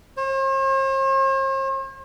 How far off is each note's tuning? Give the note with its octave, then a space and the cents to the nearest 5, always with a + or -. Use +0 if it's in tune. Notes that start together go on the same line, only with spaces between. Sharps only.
C5 +45